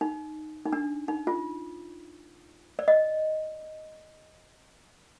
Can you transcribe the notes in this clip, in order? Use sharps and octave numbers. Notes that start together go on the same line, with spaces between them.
D#4
D#4
D4
D#4
F4
D5
D#5